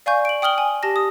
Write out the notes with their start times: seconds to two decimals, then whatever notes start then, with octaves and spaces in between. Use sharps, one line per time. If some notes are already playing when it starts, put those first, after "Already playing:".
0.06 D5 F5 G#5 C#6 G6
0.25 D7 F#7
0.42 G5 D#6 F6 F#7 G7
0.58 G#5
0.83 G4 A5 A#6
0.96 D#6